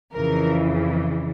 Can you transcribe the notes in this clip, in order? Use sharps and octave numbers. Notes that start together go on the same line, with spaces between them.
F2 C#3 E3 A#4